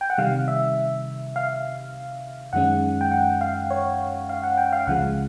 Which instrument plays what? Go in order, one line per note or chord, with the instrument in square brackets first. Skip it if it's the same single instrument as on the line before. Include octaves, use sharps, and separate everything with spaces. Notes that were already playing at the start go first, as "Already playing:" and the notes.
[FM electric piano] G5
F#5
C3 D#3 G3 F5
E5
F5
F#2 D#3 G#3 C#4 F#5
G5
F#5
F5
C#5
F5
F#5
G5
F5
C#2 C#3 F3 G#3 F#5